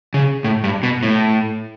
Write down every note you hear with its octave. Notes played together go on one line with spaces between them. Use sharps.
C#3
A2
G2
B2
A2